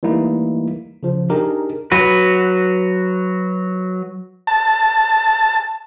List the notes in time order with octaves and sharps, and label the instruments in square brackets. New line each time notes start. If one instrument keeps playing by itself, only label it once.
[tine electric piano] E3 G3 A3 A#3 D#4 E4
C#3 F3
D4 D#4 G4 G#4 A#4
[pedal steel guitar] F#3 F#4 B4
[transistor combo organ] A5